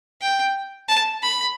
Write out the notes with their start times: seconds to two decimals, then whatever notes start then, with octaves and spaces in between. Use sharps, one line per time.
0.21 G5
0.88 A5
1.23 B5